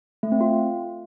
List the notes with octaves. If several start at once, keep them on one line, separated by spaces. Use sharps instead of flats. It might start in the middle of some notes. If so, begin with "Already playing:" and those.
A3
C4
F4